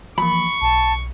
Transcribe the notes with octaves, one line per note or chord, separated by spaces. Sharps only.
E3 F3 A#3 B5 C#6
B1 A5